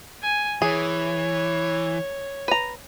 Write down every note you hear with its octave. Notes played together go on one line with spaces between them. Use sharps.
G#5
E3 G#4 C#5
B4 A#5